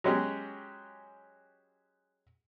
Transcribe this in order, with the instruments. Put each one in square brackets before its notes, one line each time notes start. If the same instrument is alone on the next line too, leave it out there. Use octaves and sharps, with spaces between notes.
[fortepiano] F#3 G#3 C#4 G4 G#4